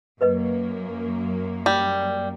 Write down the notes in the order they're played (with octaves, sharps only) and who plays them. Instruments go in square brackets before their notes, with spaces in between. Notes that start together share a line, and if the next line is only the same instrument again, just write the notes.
[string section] F#2 A#3 [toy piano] A#4 B4 D#5
[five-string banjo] G3